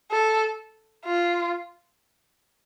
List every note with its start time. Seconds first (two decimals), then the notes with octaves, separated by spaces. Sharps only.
0.11 A4
1.05 F4